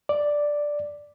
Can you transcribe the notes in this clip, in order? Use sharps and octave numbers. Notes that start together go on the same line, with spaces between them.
D5